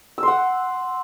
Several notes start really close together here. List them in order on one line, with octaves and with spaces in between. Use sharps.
E6 C6 F#5